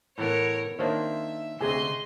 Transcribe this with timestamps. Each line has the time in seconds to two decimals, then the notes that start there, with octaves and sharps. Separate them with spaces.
0.18 A2 E3 B3 A#4 C#5
0.79 D#3 A#3 D4 C5 C#5 E5
1.61 D2 C3 G#4 D#5 G#5 C6